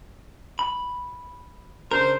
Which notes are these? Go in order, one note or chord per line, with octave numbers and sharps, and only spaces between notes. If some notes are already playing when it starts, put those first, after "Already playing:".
B5
C#3 D4 A#4 C5